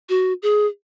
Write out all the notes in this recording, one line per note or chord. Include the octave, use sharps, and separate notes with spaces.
F#4
G#4